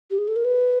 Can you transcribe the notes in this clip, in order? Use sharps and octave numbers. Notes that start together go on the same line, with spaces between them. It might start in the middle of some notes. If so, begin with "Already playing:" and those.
G4
G#4
A4
A#4
B4